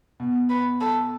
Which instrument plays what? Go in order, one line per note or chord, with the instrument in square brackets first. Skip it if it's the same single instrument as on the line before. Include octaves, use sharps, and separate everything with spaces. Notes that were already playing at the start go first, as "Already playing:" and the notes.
[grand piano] B2
[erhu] B4
A4